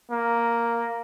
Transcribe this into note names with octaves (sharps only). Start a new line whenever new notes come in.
A#3